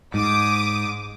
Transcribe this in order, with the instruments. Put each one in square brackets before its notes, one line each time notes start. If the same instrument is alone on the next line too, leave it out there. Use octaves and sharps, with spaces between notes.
[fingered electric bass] G#2 [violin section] D6 D#6